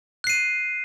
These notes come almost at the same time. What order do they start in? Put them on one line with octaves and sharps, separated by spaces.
F#6 C7 D#7